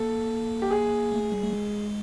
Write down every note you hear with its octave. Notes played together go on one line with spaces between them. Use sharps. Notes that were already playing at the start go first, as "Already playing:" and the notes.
Already playing: A#3 A4
G4
G#4
A3
G3
A3
G#3